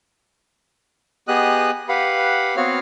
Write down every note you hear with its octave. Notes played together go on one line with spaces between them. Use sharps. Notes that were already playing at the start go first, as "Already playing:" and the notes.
B3 G4 G#4 D#5 D#6 F#6
G4 B4 F5 F#5 B5
B3 C4 F#4 C#5 F5 F6